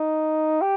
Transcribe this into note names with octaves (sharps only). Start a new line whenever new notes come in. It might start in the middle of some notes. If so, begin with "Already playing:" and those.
Already playing: D#4
G4